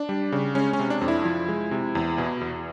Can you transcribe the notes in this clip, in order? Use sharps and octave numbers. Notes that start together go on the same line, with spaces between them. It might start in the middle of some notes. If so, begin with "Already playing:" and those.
Already playing: D4
G3
C#3
G#3 C#4
C#4
C3
D4
F2
E4
F3
G#3
C3
E2
B2
E2